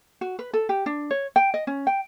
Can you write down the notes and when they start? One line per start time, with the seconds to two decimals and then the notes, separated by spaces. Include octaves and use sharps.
0.21 F#4
0.39 B4
0.53 A4
0.69 G4
0.86 D4
1.11 C#5
1.36 G5
1.54 D#5
1.67 C#4
1.87 G5